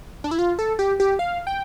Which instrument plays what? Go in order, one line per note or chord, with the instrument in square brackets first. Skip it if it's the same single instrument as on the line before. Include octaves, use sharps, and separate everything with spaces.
[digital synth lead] D4
E4
F4
A4
G4
G4
F5
G5